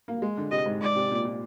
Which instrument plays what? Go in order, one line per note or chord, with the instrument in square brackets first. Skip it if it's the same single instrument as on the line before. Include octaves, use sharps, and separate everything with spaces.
[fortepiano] A#3
G#3
D3
[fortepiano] C3 [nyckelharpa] D#5
[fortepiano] G#2
[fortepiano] G#2 [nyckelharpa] D5
[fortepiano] C3
A#2
A#2